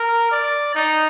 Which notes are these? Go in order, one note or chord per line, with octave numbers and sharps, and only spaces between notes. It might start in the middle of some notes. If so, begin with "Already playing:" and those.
Already playing: A#4
D5
D#4